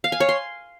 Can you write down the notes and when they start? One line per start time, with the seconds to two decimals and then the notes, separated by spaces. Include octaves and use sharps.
0.04 F5
0.12 G#5
0.20 C#5
0.29 C6